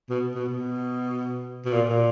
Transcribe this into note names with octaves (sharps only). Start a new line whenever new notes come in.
B2
B2
B2
B2
A#2
A#2